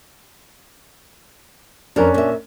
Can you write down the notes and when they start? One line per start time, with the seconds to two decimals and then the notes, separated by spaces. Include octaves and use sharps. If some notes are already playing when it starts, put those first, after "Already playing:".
1.96 F2 C#4 D4 A#4
2.14 A#2 E5